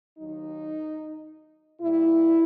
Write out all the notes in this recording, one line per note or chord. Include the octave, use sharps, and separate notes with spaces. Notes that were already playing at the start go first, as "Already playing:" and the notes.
D#2 D#3 F#3 D#4
A#2 G3 A#3 E4